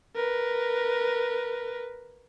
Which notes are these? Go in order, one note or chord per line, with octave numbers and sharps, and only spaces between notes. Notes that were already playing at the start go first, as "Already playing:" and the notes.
A#4 B4